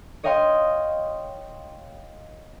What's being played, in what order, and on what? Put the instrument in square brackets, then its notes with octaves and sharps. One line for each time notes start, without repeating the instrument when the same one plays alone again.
[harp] C#5 D#5 F5 G5 C6